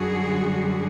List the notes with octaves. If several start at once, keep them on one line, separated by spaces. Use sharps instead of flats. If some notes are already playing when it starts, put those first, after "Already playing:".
Already playing: F#2 D3 G3 F#4 G#4